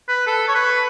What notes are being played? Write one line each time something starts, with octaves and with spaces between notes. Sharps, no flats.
B4
A4
C#5
B4